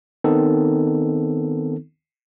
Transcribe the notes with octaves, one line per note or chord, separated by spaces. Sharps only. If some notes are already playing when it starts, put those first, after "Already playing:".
D#3 B3 C4 D#4 A4